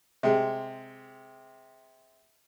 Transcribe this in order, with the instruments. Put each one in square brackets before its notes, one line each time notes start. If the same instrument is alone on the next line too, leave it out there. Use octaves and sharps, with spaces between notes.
[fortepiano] C3 G#3